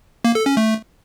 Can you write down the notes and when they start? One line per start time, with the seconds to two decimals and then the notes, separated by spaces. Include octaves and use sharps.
0.24 A#3
0.35 A4
0.46 C#4
0.57 A3